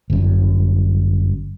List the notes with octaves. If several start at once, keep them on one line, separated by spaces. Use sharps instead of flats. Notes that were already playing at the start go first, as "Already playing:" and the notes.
G1 F#2